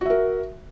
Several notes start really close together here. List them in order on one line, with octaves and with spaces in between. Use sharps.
F#4 E5 A#4